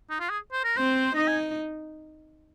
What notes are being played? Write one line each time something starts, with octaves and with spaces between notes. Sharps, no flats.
D#4
F4
G#4
C5
A#4
C4 C5
D#4 D#5
G#5